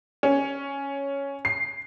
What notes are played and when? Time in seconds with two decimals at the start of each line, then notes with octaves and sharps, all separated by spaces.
0.23 C#4
1.45 C7